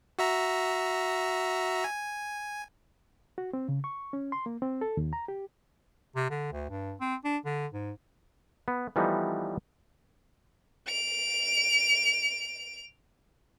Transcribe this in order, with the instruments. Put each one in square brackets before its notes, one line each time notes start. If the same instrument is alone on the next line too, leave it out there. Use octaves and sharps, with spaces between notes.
[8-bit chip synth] F#4 E5 A#5
G#5
[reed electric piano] F#4
C4
C#3
C#6
C#4
C6
A#3
C4
A4
D#2
A#5
G4
[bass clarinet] C3
D3
D2
G2
C4
D4
D3
G#2
[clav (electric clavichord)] B3
E3 F3 G3 A3 B3 D#4
[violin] D7 F7